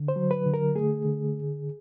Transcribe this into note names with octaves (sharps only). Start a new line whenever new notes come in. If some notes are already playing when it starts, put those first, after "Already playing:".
Already playing: D3
C5
F#3
B4
D3
A#4
A3 G#4
D3